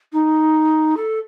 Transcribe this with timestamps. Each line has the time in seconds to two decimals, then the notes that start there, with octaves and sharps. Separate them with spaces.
0.13 D#4
0.97 A4